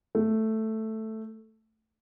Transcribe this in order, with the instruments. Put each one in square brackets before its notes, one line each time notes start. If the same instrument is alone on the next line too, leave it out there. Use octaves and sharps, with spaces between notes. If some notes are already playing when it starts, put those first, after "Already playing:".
[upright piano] A3